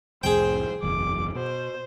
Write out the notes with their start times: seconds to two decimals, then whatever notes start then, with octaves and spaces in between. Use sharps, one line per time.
0.23 C2 F2 A2 G#4 C5 G5
0.83 F#1 B1 E2 D6
1.35 B2 C5